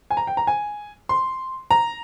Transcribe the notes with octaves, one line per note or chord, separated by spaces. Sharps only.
G#5
A#5
G5
A#5
G#5
C6
A#5